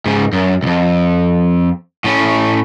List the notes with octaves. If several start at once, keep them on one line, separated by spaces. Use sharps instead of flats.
G#2 C#3
F#2
C2 F2
A2 C#4